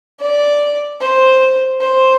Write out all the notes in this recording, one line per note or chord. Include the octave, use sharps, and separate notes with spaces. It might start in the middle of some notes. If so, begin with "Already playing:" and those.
D5
C5
C5